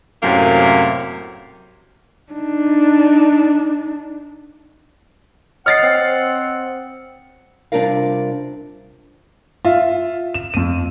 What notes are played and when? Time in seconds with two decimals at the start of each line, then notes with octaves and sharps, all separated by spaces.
0.23 F#2 A2 C3 A#3
2.33 D4 D#4
5.66 C#5 D#5 F#5 D#6 F6 A6 C7
5.83 C4
7.72 C3 G3 D4 F4 A#4 F5
9.65 F4 E5
10.34 E7
10.54 F2 D#7